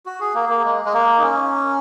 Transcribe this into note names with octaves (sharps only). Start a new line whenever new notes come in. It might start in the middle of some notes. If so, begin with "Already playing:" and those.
F#4
G#4
A#3
A#3
G#3
G#3
A#3
D#4
C#4